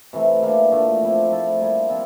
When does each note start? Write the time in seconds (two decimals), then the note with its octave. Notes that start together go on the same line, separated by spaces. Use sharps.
0.13 C3 E3 A3
0.42 E3 A#3 D4
0.72 A#2 A3 D4
1.01 F3 C4 E4
1.31 F3 A3 E4 A4
1.60 G3 A#3 E4
1.89 F3 C4 F4